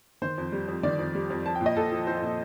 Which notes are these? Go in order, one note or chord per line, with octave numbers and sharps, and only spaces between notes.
D#3 C5
F2
G3
F2
D#3 D5
F2
G3
F2
F3 A5
G5
A#2
D#5
A#2 A4
F3
F3 C5
A#2